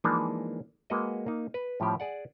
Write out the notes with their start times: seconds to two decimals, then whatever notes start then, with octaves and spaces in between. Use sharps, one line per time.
0.04 E3 F3 G#3 A#3 D4 D#4
0.90 G#3 A#3 F#4 B4 D#5
1.26 A#3 D#4
1.54 B4
1.80 A2 F3 G3 C#4 G4
2.00 G#4 D5 F#5